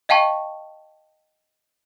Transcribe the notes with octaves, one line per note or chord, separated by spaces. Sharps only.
D#5 F5 G5 A5 C#6